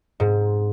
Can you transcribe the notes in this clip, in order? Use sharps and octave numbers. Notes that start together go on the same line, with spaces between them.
G#2